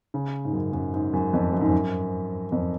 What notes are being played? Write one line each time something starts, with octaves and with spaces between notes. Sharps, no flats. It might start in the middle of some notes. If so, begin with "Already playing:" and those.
C#3
G#2
F#2
F#2
G#2
F#2
F2
F#2
G#2
F#2
F2